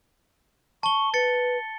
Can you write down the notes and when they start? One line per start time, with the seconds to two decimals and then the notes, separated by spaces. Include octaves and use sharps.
0.83 A5 C#6 G7
1.14 B4 A6 C#7